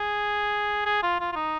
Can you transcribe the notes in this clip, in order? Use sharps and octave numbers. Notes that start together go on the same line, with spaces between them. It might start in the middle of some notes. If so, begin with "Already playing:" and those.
Already playing: G#4
G#4
F4
F4
F4
D#4